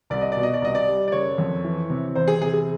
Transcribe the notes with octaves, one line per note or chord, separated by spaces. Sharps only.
C2 D5
D#5
B2 D5
D#5
D5
C2 D#5
D5
G3
D5
F#1 C#5
F2
E3
C3
E2 C5
G#4
C3 G#4
G#4